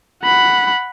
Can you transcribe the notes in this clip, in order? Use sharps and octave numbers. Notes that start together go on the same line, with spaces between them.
F#5 B5